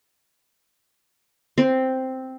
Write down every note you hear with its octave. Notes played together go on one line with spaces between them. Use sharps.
C4